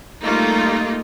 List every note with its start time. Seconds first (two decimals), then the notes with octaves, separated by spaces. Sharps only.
0.22 G3 A3 A#3 D#4 F4